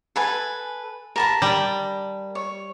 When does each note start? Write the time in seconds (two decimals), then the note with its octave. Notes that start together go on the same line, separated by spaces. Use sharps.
0.16 A4 B4 G#5
1.16 A#4 A5 B5
1.42 G3
2.35 C#5